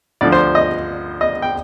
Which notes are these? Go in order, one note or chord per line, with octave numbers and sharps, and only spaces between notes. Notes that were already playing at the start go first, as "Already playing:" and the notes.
D2 D3 F3 D5
C5
D#5
D#5
G5